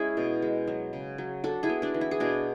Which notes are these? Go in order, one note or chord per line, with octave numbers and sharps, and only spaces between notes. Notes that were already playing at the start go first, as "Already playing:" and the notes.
Already playing: G#3 C#4 E4 G#4
B2
G#3
F#3
C#3
F#3
D4 F#4 A4
E4 G#4
B3
D4 F#4
E3
E4
G#4
B2 D4 F#4